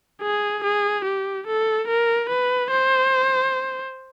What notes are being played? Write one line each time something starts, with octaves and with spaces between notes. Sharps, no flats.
G#4
G#4
G4
A4
A#4
B4
C5